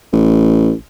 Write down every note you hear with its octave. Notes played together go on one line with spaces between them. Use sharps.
A1